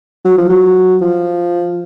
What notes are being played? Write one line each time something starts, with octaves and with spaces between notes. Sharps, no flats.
F#3
F3
F#3
F3